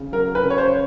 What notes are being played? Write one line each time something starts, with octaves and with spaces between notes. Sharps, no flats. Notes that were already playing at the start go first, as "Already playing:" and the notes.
Already playing: C#3
F#3 A#4
B4
C#3
C#5
C5